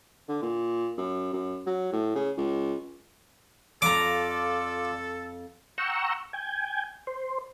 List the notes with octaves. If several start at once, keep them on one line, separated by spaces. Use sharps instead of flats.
D3
A#2
F#2
F#2
F#3
A2
C#3
C#2
F2 F4 A4 D5 A#5 D6
F#5 G5 A#5 C#6 E6
G5 G#5
C5